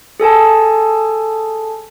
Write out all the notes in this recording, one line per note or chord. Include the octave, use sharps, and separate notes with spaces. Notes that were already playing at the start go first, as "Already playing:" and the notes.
G#4 A4 G#5 A5